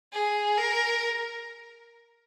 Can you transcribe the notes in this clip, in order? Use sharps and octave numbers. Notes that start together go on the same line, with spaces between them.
G#4
A#4